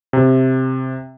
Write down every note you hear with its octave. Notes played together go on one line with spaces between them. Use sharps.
C3